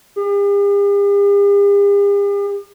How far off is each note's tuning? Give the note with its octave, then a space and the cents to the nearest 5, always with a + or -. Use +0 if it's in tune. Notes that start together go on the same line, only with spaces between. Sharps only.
G4 +45